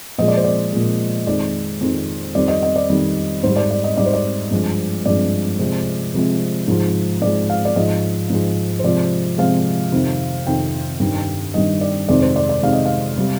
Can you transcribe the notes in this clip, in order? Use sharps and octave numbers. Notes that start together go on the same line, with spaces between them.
A#2 F3 G#3 D#5
D5
C5
D5
A#2 F3 G#3
F2 D#3 G#3 D5
F2 D#3 G#3
F2 D#3 G3 D5
D#5
D#5
D5
F2 D#3 G3
G#2 G3 C5
D5
D5
D#5
G#2 G3 D5
C5
D5
G2 F3 G#3
G2 F3 G#3 D5
C3 F3 G#3
C3 F3 G#3
G#2 F3 G#3
G#2 F3 G#3 D5
F5
D5
G#2 F3 G#3 D#5
G#2 F3 G#3
C5
C3 F3 G#3 D5
C3 F3 G#3 F5
F2 C3 D#3
F2 C3 D#3 G5
G2 D#3 G3
G2 D#3 G3 D#5
D5
F2 C3 D#3 G#3 D5
C5
D5
D5
F2 C3 D#3 G#3 F5
D#5
F5
C3 G3